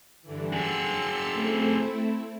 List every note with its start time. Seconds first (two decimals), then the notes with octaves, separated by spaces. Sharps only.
0.22 G2 D3 E3
0.52 F#4 G#4 C6 E6 C#7
1.31 A3 C4 E4